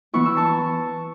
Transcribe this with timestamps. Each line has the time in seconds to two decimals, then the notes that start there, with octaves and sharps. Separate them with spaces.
0.14 E3 B3 E4 C#6
0.25 E6
0.37 A5 C#6